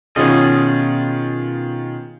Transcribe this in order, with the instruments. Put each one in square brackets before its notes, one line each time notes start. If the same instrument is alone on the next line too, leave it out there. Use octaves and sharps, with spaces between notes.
[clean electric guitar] B2 C#4 D#5 [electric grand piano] D#3 F4 G#4